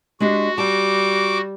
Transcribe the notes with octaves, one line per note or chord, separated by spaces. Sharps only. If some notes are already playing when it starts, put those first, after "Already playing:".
G#3 D4 F#4 G4
G3 A5 D6